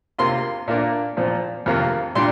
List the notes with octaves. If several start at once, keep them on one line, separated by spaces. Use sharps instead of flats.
C3 A#3 F4 C6
A#2 A#3 D4 F4
A#2 F3 C4
F2 C3 A#3 F4
A#2 G3 D4 C6